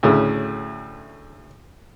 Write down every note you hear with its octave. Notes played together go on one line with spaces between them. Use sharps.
D2 A2 C#3